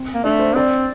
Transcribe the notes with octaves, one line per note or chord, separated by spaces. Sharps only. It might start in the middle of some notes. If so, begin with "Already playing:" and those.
Already playing: C4
A#3
A3 D4
C5
C4 D5